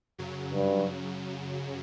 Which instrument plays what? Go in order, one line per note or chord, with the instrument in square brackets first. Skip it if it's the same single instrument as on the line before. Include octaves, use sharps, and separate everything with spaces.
[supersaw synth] F#2 C#3 F#3
[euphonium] G2